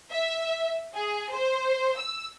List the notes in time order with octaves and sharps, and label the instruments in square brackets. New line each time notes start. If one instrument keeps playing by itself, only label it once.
[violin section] E5
G#4
C5
E6